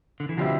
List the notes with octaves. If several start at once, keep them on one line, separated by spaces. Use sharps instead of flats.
D3
E3
B2 D3 F3 G3 C4 E4